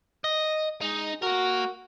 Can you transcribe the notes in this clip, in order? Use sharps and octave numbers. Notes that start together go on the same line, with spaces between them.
D#5
G#3 D#4
A#3 F#4 A#4